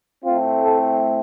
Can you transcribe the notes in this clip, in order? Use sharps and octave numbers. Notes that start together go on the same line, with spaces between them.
A2 A3 C4 F4
A4